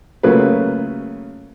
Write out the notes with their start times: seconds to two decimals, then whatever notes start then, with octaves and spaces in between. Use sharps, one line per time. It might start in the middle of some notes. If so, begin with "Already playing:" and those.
0.23 C#3 F#3 A3 A#3 F4 B4